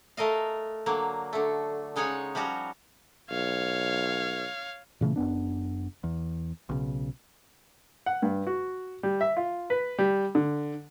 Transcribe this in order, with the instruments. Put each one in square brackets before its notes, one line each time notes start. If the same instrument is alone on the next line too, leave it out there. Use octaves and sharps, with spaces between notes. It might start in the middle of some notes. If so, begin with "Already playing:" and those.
[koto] A3 A#4 D#5 F5
D3 F#3 A#3
D3 A3
C#3 G#3 D#4 C#5 F#5 G#5
F3 G3 C#4 F#4 A#5
[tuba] B1 [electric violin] C#5 F5
[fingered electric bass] A#2 C#3 E3 A3
F#1 F#2 B3 D4
E2
B1 C#3
[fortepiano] F#5
G2
F#4
G3
E5
F4
B4
G3
D3